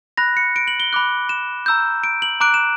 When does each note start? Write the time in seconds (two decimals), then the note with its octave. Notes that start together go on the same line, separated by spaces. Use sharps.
0.17 B5 F#6 A#6
0.37 C#7
0.56 D7
0.68 F#7
0.80 G7
0.93 B5 D6 F#6
1.29 E7
1.66 A#5 E6 G6
2.04 D7
2.22 F#7
2.40 A#5 D6 F#6 D7
2.54 E7